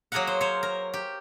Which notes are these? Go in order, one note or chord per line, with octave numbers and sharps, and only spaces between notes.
F#3 A#3 G#4 A#4 F5 F#5
C5
C5 C#5
A#4
G4